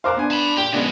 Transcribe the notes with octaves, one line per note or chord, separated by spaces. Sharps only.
A#4 C5 F5 G#5 C6 D6 F#6
B3 D4 G#5
A5 B5
A#2 G4 G5
C#3 F3 G#3 B3 D4